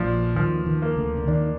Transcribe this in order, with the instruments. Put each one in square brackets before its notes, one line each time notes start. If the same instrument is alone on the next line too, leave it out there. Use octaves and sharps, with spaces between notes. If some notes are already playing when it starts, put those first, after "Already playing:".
Already playing: [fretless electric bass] A#1 A#2 [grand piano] F3 D4
[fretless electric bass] D#2 D#3 [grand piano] F3
[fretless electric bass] D#2 D#3
[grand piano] A#3
[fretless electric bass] D2 D3
D3
[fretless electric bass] D#2 D#3 [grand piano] D4